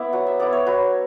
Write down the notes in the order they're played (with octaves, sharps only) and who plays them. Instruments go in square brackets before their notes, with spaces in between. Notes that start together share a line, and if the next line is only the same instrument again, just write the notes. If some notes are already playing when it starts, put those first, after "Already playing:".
Already playing: [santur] B3 E4 D5 E5
F#3 F#5
E5
B3 E4 D5
C#5
F#3 B4